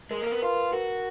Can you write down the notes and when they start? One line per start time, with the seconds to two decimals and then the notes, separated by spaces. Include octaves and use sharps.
0.11 G#3 A#4
0.22 A#3 A#4
0.32 B3
0.42 F4 B4
0.73 F#4 A#4